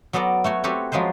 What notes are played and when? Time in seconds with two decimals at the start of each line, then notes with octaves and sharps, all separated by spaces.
0.13 F#3 B3 A4 D5 A#5
0.44 A3 F#4 C#5
0.64 C4 F#4 G4 A4 B4 C#5
0.92 F3 F#3 G#3 B4 C5